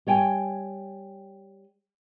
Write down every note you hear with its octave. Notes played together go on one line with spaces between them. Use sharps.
G3 C#5 G5 G#5